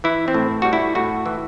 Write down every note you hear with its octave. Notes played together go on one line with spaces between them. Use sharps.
E3 E4
C4
A2
G3 F#4
E4
A2 F#4
E3